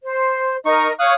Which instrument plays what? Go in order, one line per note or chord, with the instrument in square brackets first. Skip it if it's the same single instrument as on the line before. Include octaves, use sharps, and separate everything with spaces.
[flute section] C5
[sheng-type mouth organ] D#4 C#6 [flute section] A#4 D#5
[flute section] C#5 C#6 [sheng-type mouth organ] F5 D#6 F#6